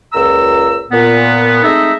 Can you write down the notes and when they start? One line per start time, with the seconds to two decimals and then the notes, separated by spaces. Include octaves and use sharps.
0.13 C#2 A#2 A#5 E6
0.91 A#2 B3
1.63 G#3 A3 C4 D#4 D#5 E5